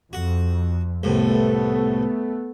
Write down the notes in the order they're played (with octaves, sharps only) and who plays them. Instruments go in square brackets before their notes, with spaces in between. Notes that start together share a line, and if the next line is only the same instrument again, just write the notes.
[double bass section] F2 [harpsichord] F#4
[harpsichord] C2 A2 [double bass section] A3 B3